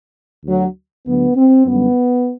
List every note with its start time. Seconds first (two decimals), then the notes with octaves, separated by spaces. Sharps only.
0.45 D2 D3 F#3
1.06 D2 D3 F#3 B3
1.36 C4
1.66 F#2 D3 G3 B3